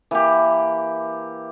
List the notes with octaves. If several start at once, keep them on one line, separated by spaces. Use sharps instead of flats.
E3 A#3 G4